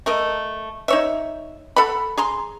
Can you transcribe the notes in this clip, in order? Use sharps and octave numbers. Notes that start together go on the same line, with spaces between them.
A3 A#4 D#5
D#4 C#5 E5
A4 F#5 B5
G#4 A#5 C6